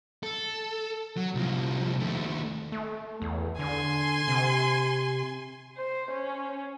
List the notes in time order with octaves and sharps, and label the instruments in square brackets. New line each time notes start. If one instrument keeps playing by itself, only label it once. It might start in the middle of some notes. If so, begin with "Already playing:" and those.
[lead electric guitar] A4
F#3
C2 F3
D#2 A3
[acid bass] A3
E2
[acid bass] D3 [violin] G#5 C6
[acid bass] C3
[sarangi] C5
C#4